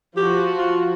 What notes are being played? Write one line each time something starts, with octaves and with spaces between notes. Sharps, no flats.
F3 F#4 G4
F4